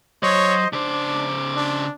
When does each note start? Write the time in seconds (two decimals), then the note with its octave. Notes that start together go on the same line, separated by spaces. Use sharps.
0.23 F#3 C5 C#5 D#5
0.73 C#3 D4 C5 D6
1.56 D4